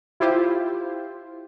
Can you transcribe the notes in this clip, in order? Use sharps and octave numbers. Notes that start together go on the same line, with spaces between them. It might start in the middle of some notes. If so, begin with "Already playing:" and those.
E4 F4 G4 C5